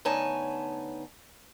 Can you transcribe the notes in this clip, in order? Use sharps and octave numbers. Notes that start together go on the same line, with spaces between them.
D2 B3 D#4 C#5 G#5 A5